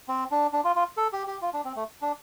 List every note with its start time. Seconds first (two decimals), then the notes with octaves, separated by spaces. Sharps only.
0.09 C4
0.31 D4
0.53 D4
0.64 F4
0.76 F4
0.97 A4
1.13 G4
1.27 G4
1.42 F4
1.54 D4
1.65 C4
1.76 A3
2.02 D4